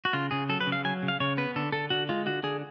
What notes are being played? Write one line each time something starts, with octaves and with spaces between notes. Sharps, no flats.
F#4
C#3 F4
C#3 G#4
F#3 A4
B4
C#3
F5
F#3 G#5
C#3
F5
C#3 C#5
B3 B4
D3 A4
D3 A4
D3 F#4
G#3 F4
D3 F#4
D3 G#4